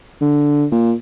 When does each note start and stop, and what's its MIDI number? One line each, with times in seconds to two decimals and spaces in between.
0.21 0.65 50
0.71 0.93 46